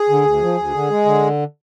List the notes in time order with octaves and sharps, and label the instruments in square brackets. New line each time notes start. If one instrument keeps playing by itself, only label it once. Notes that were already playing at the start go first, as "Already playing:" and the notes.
Already playing: [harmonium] G#4
D3
D2
F3
D2
D3
G#3
D3